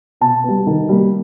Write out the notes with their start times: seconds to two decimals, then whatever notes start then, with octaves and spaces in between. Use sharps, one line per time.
0.21 B2 A5
0.44 G3 B3
0.67 D#3
0.89 G3 A#3